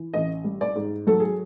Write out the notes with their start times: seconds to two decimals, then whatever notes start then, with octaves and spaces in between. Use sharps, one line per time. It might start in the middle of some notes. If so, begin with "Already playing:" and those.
Already playing: E3
0.14 A1 D#5
0.44 G3
0.61 D5
0.75 G#2
1.07 F#3 A4
1.20 G#4